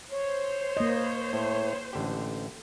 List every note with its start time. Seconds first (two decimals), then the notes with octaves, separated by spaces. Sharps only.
0.12 C5 C#5
0.77 A#3 D#5
1.33 A2
1.93 A1 D3 G4